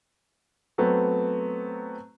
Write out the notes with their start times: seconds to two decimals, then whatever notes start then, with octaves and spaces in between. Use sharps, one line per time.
0.78 F#3 A3 B3 C4